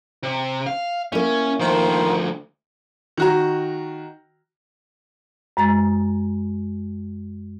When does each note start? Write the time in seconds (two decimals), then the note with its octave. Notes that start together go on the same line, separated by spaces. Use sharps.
0.23 C3
0.66 F5
1.12 A#3 C#4 E4
1.60 D2 D#3 F3 C5
3.17 D#3 F#4 A#5
5.57 F#2 G#3 A#5 A6